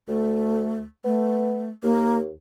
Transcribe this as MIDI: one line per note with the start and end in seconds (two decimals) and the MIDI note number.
0.08 0.85 38
0.08 0.79 57
1.04 1.69 57
1.04 1.68 59
1.83 2.31 39
1.83 2.17 58